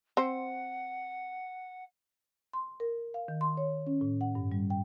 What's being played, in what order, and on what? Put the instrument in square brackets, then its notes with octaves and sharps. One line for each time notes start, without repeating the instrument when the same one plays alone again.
[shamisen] C4 C5 [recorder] F#5
[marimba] C6
A#4
F5
D#3
C6
C#5
C#4
A2
F#5
G2
G3
G5